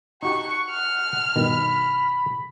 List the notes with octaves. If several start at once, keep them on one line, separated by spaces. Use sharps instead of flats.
D#4 F#4 G4 F#5 C#6
F6
G2 B2 D#3 B5